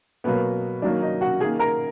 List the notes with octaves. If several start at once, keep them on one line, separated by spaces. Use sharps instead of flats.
B2 F#3 A#3 B3 B4
D#3 F#3 A#3 D4 D5
D#4 D#5
F#4 F#5
D#3 A#3 G#4 G#5
A#4 A#5